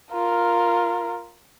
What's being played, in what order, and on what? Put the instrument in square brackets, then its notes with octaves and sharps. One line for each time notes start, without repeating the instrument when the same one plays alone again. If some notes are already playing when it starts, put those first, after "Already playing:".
[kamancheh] F4 A#4